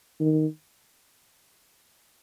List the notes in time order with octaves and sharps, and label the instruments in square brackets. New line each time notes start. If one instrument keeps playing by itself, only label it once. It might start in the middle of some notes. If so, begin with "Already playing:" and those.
[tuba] D#3